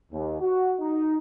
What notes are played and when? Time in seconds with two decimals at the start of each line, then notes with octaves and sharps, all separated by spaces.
0.12 D#2
0.41 F#4
0.80 D#4